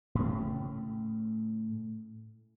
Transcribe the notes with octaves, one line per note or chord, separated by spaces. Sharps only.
A2 C#3 A3